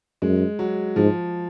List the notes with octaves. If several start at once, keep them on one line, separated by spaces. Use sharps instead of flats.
F#2 G#3
F#3
G#2 F3